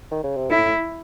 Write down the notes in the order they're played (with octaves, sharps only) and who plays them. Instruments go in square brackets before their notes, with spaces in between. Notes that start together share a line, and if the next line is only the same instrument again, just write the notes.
[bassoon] D#3
C#3
C3
[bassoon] A2 [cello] E4